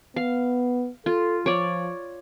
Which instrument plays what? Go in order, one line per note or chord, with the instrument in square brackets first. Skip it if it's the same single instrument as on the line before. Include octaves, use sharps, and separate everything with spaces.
[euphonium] B3 [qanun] F5
[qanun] F4 [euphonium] A4
[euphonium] F3 [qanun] C#5 D5